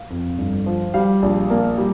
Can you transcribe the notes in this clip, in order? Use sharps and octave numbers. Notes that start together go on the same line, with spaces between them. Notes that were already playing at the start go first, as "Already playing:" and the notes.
Already playing: F5
F2
G1
F3
G3 F5
A#1
A#3
G3